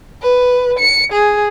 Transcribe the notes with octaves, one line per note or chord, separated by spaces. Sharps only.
B4
C#7
G#4